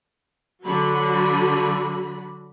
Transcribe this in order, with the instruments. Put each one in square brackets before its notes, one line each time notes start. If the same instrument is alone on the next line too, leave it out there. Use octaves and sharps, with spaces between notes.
[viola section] D3 F#3 F#4 B5